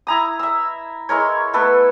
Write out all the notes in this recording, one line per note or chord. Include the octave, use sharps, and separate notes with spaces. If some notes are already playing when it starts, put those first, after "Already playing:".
E4 A#5 D#6
E5 E6
G#3 E4 A#4 C#5
A3 B3 A4 B4